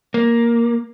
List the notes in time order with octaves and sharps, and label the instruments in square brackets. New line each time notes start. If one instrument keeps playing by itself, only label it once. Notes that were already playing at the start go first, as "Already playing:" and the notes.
[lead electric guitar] A#3